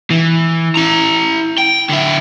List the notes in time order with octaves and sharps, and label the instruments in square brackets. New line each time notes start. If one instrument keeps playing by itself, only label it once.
[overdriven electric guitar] E3
E4 A#5
G5
D3 E4